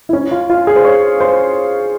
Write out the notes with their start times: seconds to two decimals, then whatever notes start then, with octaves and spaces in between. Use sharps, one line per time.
0.09 E4
0.13 C#4
0.31 F4
0.50 F4
0.67 G#4
0.76 C5
0.85 C#5
1.20 C5